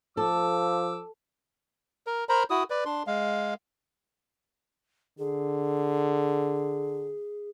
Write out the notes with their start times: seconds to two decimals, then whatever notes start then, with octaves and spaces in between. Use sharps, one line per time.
0.17 F3 A4 D6 E6
2.07 A#4
2.29 A#4 C5 A#5 B5
2.50 E4 F#4 D#6
2.70 B4 D5
2.85 D4 C6
3.07 G#3 F5
5.19 D3 G#4